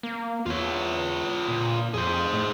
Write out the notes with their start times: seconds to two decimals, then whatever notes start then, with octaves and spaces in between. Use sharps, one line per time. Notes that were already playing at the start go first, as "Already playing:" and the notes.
0.03 A#3
0.46 E2 F4 C#5
1.48 A#2
1.94 F2 G#4 C5
2.33 A2